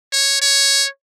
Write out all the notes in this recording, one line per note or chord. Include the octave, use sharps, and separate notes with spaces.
C#5
C#5